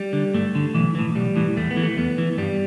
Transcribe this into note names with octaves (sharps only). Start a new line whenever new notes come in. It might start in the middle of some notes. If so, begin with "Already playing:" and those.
Already playing: G3
D3
G2 A3
D3
B1 E3
A2 E3
B1 G3
A2 E3
E2 A3
B3
E3
A3
E2 B3
E3
G2 G3